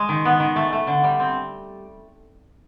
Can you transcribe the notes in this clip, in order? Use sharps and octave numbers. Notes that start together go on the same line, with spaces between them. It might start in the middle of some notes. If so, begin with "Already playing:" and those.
Already playing: G#3
D#3
B3
D#3
A3
A3
D3
G3
C4